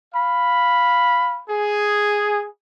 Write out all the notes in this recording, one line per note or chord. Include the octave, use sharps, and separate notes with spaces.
F5 B5
G#4